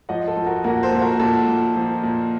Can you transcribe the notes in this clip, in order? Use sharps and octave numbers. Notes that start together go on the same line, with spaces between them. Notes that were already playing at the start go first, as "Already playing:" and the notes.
F3 D#5 F#5
A4
F3
F#4 A#4
A#2 F#4 A#4
A4 C5
A#2
F#4 A#4
A#2 A4
A#2
F3
A#2